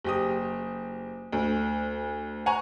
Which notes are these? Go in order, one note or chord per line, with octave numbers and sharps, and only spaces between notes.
F#1 G4 D#6
D2
F#5 G#5 A#5 C#6